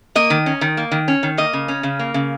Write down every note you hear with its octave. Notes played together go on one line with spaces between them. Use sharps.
A#3 D#5
D#3
C#4
D#3
A#3
D#3
C#4
D#3
A#3 D#5
C#3
C#4
C#3
A#3
C#3